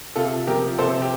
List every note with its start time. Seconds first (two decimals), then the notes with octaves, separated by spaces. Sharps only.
0.16 C3 F4 A4
0.47 F3 G4 A#4
0.79 C3 A4 C5
1.02 G4